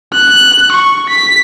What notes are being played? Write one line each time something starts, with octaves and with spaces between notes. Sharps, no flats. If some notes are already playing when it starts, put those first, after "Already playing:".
F#6
C#6
B6